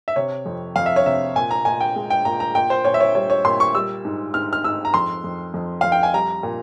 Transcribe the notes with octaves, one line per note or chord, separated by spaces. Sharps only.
E5
C3 C#5
F2
F2 F5
E5
C#5
C3 E5
A#2 G#5
A#5
A#2 G#5
G5
G#3
G5
A#2 A#5
A#5
A#2 G5
C5
A#2 C#5
E5
C#5
G3 C#5
C#5
A#2 C6
C#6
G3 E6
G#2
G#2 F6
F6
G#2 E6
A#5
F2 C6
F2
F2
F2 F5
G5
G#5
G3 A#5
A#2